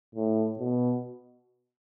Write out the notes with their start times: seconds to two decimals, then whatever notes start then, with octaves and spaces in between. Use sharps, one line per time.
0.15 A2
0.59 B2